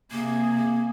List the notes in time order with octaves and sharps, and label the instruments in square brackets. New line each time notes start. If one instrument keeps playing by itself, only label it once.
[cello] C3 G#4 [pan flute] A#3